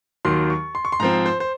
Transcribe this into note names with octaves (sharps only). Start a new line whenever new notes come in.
D#2 D#3 F#3 C6
C#6
C6
C#6
C6
G#2 F3 C4 A#5
C5
C5